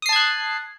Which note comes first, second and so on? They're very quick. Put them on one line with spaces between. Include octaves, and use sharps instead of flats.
D#6 C7 A5 G#6 F#6